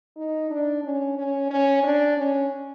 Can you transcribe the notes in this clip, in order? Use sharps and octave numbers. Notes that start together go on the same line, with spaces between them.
D#4
D4
C#4
C#4
C#4
D4
C#4